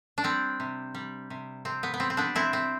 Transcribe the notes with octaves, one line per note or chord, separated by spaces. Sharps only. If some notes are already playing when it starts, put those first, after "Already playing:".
D4
G3 C4
C3
G3
C3
C3 C4
B3
B3
G3 C4
C4
B3 D4
C3 C4 E4
C4